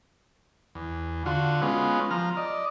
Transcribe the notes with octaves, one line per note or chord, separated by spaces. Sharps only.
E2
D3 F4 F#4
G#3 B3 C#4 F4
F3 A#5 F6
D5 D#5